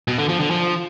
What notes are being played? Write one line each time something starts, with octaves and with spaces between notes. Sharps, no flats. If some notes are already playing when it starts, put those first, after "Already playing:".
B2
D3
F3
D3
F3